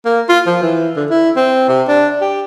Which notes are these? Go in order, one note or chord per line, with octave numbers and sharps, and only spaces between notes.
A#3
F4
F3
E3
D3
E4
C4
C3
D4
G4